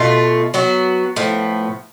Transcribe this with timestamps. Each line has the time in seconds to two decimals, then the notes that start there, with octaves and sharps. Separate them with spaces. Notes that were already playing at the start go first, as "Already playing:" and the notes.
Already playing: B2 A3 F4
0.54 F#3 B3 F#4
1.16 A2 F3 B3